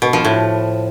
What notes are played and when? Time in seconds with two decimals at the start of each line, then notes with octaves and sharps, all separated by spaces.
0.02 B2
0.13 F3
0.25 A2